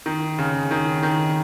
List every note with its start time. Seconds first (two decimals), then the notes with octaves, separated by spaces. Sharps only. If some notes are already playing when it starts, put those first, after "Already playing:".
0.06 D#3
0.39 C#3
0.71 D#3
1.03 D#3